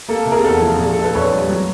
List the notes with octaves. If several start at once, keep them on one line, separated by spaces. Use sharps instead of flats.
A#3 A4
C3
G#4 A#4
E2 A4
F3
A#1 G#4
A4
A#2
A4 B4
A#1 B4 C#5
G3
F#3